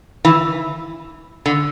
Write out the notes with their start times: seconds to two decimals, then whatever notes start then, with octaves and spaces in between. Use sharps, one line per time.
0.25 E3
1.46 D3